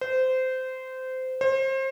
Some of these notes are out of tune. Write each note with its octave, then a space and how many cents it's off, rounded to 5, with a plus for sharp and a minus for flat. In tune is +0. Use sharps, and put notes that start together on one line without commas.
C5 -20
C5 +30